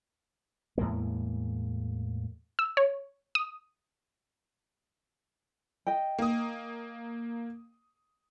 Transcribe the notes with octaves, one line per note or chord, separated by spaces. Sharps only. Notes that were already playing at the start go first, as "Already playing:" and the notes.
E2 A2 G#3 A#3
E6
C#5
D#6
D#5 G5
A#3 D#6